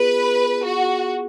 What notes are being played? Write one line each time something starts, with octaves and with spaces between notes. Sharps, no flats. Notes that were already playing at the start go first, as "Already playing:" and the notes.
Already playing: B3 F4 G#4 B4
F#4